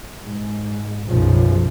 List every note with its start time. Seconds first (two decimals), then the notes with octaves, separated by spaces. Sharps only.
0.24 G#2
1.06 B1 F#2 C#3 F3